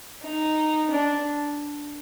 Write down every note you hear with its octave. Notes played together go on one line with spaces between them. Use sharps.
D#4
D4